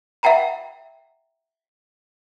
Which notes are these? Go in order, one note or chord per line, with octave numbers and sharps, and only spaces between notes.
E5 F#5 G5 A#5 B5